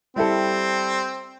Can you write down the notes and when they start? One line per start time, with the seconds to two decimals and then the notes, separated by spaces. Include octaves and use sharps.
0.16 G3 C4 E4 A4